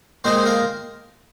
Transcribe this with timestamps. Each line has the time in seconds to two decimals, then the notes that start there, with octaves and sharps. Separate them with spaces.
0.24 A#2 G#3 C4 D#4 C5
0.45 A#3 A#4